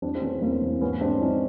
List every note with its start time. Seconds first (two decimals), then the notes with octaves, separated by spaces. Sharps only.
0.02 E2 C4 D4
0.15 C4
0.22 E2 B3 C#4
0.42 E2 A#3 C4
0.61 E2
0.81 G#2 B3 C#4
1.01 G#2 C4 D4
1.21 F3 C#4 D#4